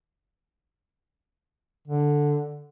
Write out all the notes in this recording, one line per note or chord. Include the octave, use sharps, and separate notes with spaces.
D3